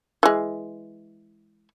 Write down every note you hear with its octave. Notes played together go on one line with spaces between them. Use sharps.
E3 G#3